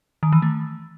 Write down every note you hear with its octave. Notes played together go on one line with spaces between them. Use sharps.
D#3
E3
A3